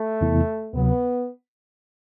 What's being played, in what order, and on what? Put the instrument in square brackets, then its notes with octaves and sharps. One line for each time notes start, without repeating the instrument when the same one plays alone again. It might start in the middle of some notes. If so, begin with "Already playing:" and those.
Already playing: [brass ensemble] A3
[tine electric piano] E2 C3 E3 B3 E4
[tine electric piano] D2 C3 F#3 [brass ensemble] B3